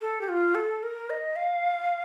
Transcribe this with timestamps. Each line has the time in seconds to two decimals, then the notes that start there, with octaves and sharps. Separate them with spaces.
0.01 A4
0.21 G4
0.29 F4
0.55 A4
0.83 A#4
1.10 D#5
1.36 F5